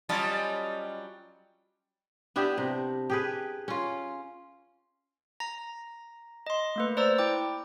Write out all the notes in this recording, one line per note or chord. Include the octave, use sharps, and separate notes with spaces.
F#3 G3 C#4 F4 D#5 A5
B3 D4 E4 G4
C3
G4 G#4 B4
C#4 F4
A#5 A#6
D#5 C6
A3 A#3 B4
C5 D5 A#5 E6
E4 G5 D6